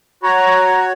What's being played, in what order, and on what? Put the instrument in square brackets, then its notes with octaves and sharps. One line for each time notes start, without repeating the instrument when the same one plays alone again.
[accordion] F#4 C#5 [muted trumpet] A#5